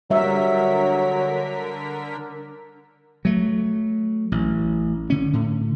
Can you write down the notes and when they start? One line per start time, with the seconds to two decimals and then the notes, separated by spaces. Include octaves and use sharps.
0.10 D3 F#3 G3 A#4 E5 B6
3.25 F#3 A3
4.32 A1
5.10 D3 C#4
5.33 A2 D3